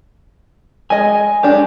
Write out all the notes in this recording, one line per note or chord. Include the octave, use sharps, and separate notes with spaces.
G#3 D#5 G#5
G#3 D4 G4